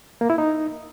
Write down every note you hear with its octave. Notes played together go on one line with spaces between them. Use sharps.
A#3
E4
D#4